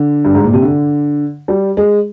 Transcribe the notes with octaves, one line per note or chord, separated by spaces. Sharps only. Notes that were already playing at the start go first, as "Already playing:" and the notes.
Already playing: D3
G2
G#2
A#2
C3
D3
G3
G#3